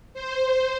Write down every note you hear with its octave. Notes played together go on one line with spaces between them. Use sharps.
C5